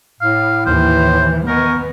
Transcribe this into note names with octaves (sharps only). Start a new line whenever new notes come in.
A2 F5
D#2 E3 C5
B3 A#4 D#5 G#5 C#6